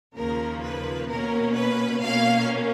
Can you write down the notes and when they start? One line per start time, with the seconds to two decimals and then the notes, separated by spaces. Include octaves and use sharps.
0.16 D#2 C#3 F3 A#3 A#4
0.63 B4
1.09 B2 A#3 C#4 A#4
1.55 B4
2.01 B2 A#3 C#4 F5